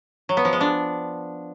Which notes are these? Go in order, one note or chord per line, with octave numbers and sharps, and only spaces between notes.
F#3
B3
F3
G#3
D4